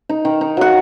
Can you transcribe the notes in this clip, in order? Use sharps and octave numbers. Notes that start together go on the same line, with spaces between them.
D#4
D#3
D#4
F#3 F#5